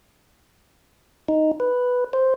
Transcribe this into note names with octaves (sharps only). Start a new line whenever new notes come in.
D#4
B4
C5